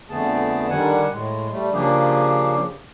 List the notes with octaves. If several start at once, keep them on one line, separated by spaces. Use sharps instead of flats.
F2 D3 A3 B3 G#4 A5
D3 D#3 G3 D4 F#5 G#5
A2 G#3
G3 A3
C#3 F3 A#3 D4 G4 G#4